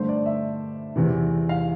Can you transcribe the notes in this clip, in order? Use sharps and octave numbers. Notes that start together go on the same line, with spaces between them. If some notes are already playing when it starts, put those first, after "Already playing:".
Already playing: G2 D3 A3 C5
D5
E5
E2 C3 E3
F5